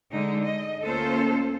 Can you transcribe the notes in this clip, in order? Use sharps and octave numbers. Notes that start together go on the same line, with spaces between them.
D3 G#3 D#4
D#5
D2 A#3 C#4 F4 A4 C5